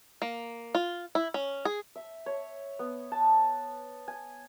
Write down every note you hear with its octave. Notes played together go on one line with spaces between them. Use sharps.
A#3
F4
E4
C#4
G#4
E5
C#5
B3
A5
G#5